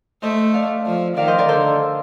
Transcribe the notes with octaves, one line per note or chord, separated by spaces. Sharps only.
A3 C5 D#5
D5 F5
F3
D#3 D5 F5
C5 D#5
A#4 D5
D3 A4 C5